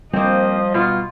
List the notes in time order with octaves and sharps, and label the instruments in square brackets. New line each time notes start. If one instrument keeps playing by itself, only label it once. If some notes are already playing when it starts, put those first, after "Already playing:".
[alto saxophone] F3 [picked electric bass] G3 [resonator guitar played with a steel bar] A#3 C4 [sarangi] D#5
[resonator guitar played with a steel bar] B2 [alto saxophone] F4